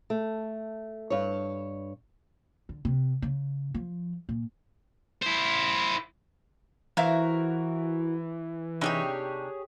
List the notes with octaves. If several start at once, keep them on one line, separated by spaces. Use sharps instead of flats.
A3
G2 C#5
D3
C3
C#3
F3
A#2
E4 C5
E3 E4 F#4 A#4 C5 E5 F5
C3 D4 D#4 G4 G#4 C#5